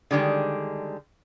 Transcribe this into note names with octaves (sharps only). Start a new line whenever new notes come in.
D3 D#3 G3 G#3